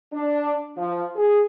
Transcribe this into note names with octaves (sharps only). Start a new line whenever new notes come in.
D4
F3
G#4